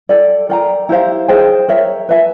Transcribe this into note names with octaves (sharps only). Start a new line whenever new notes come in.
A4 D5 G5
A#4 D5 G5 A#5
E4 G4 C5 F5
G#4 C5 D#5 G5
A#4 C#5 E5
B4 E5 G#5